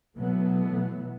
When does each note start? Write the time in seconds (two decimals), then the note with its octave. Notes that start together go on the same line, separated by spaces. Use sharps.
0.16 B2 E3 F#3 A3 B3